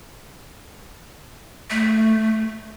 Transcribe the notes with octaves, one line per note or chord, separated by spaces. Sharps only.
A3